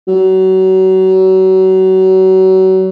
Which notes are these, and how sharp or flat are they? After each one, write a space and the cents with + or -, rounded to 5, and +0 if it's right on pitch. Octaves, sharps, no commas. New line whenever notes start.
F#3 +30